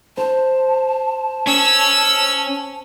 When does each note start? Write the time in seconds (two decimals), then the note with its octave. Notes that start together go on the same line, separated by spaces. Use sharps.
0.17 C5 A5
1.47 C#4 E6